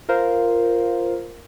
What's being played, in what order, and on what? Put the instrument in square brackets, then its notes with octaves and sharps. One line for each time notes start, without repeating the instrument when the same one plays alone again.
[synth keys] F4 A#4 C5 F5